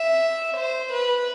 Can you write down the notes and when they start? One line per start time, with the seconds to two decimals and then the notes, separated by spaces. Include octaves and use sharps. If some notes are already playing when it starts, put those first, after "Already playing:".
Already playing: E5
0.56 C5
0.93 B4